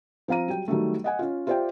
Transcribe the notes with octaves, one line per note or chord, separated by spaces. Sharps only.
F3 C4 F5 A#5 D#7
F#3 G3 G5
D#3 F#3 G3 A3
D#5 F#5 G#5
C#4 F4
F4 G4 C5 D5 E5 G5